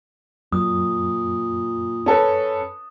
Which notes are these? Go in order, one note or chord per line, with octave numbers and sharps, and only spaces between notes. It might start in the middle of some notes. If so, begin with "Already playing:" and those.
F#2 A#2 D#6
C#4 A4 B4